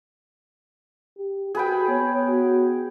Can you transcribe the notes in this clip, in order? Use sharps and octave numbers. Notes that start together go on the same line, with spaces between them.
G4
F#4 G#4 B4 G5
B3 C#5
F#4